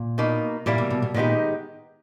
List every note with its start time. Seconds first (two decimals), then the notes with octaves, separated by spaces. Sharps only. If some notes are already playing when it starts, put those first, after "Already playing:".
Already playing: A#2
0.18 B2 A#3 D#4
0.66 A#2 E3 G3 A#3 E4
0.78 B2
0.90 B2
1.02 B2
1.14 A#2 D#3 G#3 B3 D#4 G4